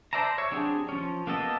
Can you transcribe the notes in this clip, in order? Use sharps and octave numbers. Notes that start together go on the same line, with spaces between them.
C5 D5 E5 A5 A#5
C#5 E5
F#3 C4 D4 G4 G#4
F3 C#4
A#3 B3 G4 A4 D#5